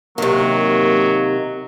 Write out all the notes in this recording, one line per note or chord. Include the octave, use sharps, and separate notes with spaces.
C3 D#3 F#3 A#3